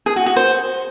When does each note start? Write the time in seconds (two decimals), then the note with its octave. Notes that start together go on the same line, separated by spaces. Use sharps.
0.06 G#4
0.16 F#4
0.26 F#4
0.36 C5